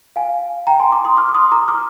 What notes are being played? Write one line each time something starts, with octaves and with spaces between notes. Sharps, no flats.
F5 G#5
G5 A#5
G#5 C6
A#5 D6
C6 D#6
D6 F6
D6
C6 D#6
A#5 D6
D6 F6